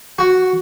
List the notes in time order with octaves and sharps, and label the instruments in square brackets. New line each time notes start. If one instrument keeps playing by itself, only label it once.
[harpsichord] F#4